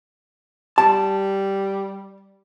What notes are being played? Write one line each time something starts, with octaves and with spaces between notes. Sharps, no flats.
G3 A5